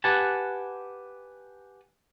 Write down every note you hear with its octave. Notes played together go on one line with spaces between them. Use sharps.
G4 B4 F#5 G#5 A5